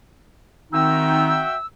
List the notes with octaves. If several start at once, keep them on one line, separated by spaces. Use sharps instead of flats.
D#3 C4 D#4 F#4 E5 G5 E6